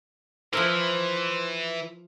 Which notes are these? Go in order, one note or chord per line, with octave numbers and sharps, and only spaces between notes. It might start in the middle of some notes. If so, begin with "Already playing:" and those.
E3 F3 E4 A#4 C5